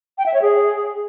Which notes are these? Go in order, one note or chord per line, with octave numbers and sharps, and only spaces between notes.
G5
E5
C#5
G#4